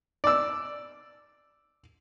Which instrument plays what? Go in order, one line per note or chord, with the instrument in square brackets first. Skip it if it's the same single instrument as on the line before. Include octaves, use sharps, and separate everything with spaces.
[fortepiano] D5 E6